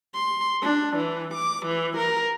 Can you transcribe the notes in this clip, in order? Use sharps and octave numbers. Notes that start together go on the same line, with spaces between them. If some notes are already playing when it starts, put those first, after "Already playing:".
C6
D4
E3
D6
E3
A#4